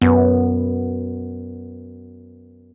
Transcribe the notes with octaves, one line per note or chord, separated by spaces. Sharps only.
F#2 B3